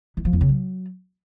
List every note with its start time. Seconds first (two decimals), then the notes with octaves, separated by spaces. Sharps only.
0.17 E3
0.25 F3
0.33 E2
0.41 C#3
0.49 F#3